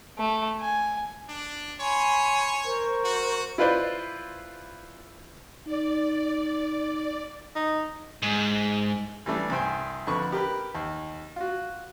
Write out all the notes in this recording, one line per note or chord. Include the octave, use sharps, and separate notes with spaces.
A3
G#5
D4
C#5 G#5 B5 C6
A#4 C5 C#6
F#4
E4 F4 B4 C5 D5
D#4 D5
D#4
G#2
E3 G3 A3 D4
C2 G2 C5 G5 G#5
F2 D3 B4 C#6
G4 A#4 B4 B5
D#2
F4 F#4